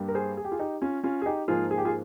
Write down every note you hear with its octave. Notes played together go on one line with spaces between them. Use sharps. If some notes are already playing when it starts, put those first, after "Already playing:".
Already playing: G2 G3 A#3
A#4
G#4 C5
G#4
G4
F4 G#4
D#4 G4
C#4 F4
C#4 F4
G#4
D#4 G4
G#2 F3 A#3 F4 G#4
G#4
G4
F4 G#4